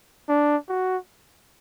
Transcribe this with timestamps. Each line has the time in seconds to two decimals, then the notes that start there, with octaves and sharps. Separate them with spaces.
0.28 D4
0.69 F#4